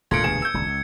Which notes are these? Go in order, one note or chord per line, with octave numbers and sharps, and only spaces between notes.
E1 D2 G2 A#2 A3 G#6 C#7 D7
G1 G#4 E7
E6 G6
D#1 C#2 D3
C#2